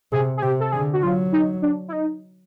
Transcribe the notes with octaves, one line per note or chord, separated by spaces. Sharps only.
C3 G#4
G#4
C3 G4
A4
D3 G#4
F#4
F#3 F4
D#4
D4
E4
D#4